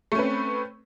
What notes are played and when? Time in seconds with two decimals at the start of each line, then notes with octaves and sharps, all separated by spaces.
0.12 A3
0.15 C#4
0.19 B4
0.22 C4